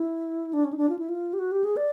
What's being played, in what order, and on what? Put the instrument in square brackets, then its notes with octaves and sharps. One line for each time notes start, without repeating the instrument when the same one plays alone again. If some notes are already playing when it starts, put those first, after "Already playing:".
Already playing: [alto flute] E4
D4
C#4
D#4
D4
F4
E4
F4
G4
F#4
G4
G#4
D5